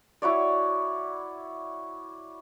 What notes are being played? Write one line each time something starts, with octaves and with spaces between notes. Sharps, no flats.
E4 F#4 C#5 D5